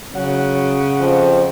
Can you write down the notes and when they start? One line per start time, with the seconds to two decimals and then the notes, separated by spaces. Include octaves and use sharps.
0.15 C#3 F#3 F#5
0.99 F2